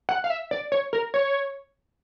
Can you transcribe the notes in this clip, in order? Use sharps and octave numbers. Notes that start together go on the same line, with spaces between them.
F#5
F5
E5
D5
C#5
A#4
C#5